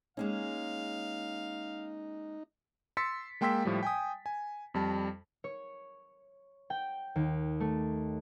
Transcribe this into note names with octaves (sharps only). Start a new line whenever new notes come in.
G#3 A#3 C#4 D#4 F5
C6 E6 A6 B6 C#7
G#3 A#3 G5 C6 E6 B6
A2 F3 G3
G5 G#5 D#6
G#5
F2 G3 A5
C#5
G5
D#2
A3